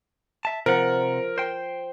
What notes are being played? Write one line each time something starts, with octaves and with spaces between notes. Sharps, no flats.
E5 A5
C3 F3 A#4 F#5
C5 G5